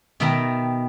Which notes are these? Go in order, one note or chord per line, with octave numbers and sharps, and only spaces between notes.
B2 D#3 E5 G5 A5 A#5